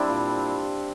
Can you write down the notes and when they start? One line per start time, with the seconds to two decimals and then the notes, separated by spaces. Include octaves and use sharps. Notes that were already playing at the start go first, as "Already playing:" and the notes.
Already playing: G3 C4 D4 E4
0.08 A#2